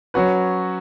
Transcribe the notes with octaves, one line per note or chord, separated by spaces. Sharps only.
F#3 C#4 F#4 B4